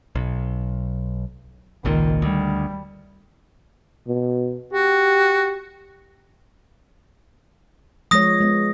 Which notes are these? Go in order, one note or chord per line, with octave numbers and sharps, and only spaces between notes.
B1
G#1 C#2 A#2 D#3
D2 G3
B2
F#4 G4
F3 G#3 C#5 D#6 A#6
G#3 B3